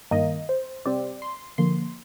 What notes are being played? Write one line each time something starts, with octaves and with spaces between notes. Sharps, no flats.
G2 D#3 A#3 D#5
C5
C3 G3 C4 D5
C6
D3 F3 A#3 C6